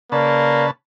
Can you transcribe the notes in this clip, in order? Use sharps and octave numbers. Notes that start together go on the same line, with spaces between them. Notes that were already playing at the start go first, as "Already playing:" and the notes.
C#3 A#3 B4 D5 A5